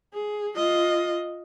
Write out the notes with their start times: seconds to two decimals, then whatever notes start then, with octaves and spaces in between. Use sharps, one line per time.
0.14 G#4
0.56 F4 D#5